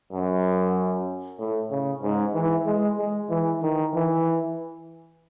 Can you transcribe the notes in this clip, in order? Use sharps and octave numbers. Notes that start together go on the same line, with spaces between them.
F#2
A2
C#3
G#2
E3
G#3
G#3
E3
D#3
E3